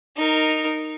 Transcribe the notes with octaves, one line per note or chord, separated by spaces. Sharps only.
D#4 A#4